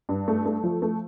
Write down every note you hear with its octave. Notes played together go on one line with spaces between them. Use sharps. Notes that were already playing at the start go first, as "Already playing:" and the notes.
G2
A3
A3
F3
A3